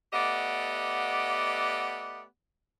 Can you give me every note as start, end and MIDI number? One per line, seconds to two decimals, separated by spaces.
0.13 2.21 57
0.13 2.21 59
0.13 2.21 67
0.13 2.21 74
0.13 2.21 75
0.13 2.21 78